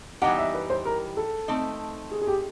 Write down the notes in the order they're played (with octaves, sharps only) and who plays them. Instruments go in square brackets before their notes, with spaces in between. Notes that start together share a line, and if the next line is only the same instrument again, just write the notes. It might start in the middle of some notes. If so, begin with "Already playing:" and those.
[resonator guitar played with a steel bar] E3 G3 B3 D#4 G4 [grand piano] F#5
[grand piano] E5
B4
C5
A#4
A4
[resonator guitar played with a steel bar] A3 C4 D#4
[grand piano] G#4
G#4
G4